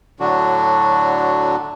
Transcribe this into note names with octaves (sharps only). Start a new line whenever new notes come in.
A2 D3 F#3 D4 F#4